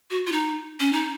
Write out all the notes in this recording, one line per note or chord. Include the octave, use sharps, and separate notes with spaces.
F#4
F4
D#4
C#4
D#4